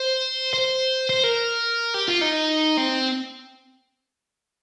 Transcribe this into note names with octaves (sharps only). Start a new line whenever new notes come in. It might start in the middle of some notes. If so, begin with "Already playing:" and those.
Already playing: C5
C5
C5
A#4
G4
F4
D#4
C4